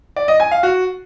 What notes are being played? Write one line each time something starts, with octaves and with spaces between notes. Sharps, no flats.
D5
D#5
G#5
F5
F#4